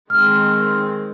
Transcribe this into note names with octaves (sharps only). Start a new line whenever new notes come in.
D#3 G#3 C4 F6